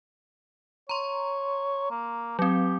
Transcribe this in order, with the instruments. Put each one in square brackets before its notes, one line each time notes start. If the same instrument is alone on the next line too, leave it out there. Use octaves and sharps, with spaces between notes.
[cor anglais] C#5 [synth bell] A#5 C6
[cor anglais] A#3
[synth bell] F#3 C4 [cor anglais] G4